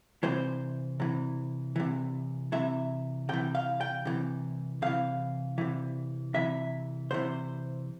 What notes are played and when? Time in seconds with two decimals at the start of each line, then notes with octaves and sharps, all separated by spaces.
0.23 C3 E3 C5
1.00 C3 E3
1.76 C3 E3
2.52 C3 E3 E5
3.29 C3 E3 G5
3.55 F5
3.81 G5
4.05 C3 E3
4.82 C3 E3 F5
5.58 C3 E3
6.34 C3 E3 E5
7.11 C3 E3 C5